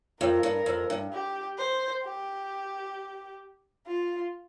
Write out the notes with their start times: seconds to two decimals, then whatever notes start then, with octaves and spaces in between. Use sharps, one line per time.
0.21 F2 A#4
0.43 G2
0.66 F2
0.90 G2
1.12 G4
1.58 C5
2.04 G4
3.87 F4